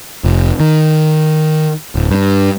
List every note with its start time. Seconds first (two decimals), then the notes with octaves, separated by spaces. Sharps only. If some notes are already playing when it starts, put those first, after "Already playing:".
0.24 F1
0.60 D#3
1.95 D1
2.11 G2